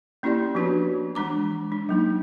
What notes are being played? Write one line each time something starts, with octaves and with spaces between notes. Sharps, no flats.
A#3 C#4 E4 G4 D5 C6
F3 B3 D4 F#4 B4
E3 G#3 D4 A#5 D6
D4
F#3 A#3 D#4